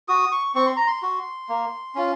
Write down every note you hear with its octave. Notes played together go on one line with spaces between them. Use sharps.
F#4 D#6
C#6
C4 C#6
C6
A#5
C6
F#4
A#3
C#4 F4